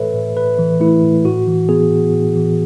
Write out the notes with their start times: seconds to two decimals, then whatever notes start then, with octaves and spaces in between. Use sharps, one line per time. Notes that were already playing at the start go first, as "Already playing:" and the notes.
Already playing: A2 E3 A3 A4 B4 C#5 E5
0.14 A2
0.36 A2 B4
0.58 E3
0.80 A3 E4
1.03 A2
1.25 A2 F#4
1.47 E3
1.69 B3 G#4
1.91 A2
2.13 A2
2.36 E3